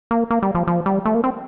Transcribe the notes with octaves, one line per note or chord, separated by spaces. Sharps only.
A#3
A#3
G3
F3
F3
G3
A3
A#3
C4